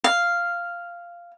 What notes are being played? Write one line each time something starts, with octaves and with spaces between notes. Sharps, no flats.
F5